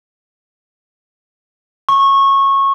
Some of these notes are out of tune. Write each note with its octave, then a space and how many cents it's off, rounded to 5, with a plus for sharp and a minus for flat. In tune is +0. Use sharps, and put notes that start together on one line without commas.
C#6 -20